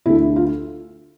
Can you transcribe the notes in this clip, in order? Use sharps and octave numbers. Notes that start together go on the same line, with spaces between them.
D2 D3 A3 E4
F4